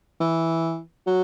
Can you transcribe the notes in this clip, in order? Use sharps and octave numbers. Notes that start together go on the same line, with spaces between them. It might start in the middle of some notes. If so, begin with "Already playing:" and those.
E3
F#3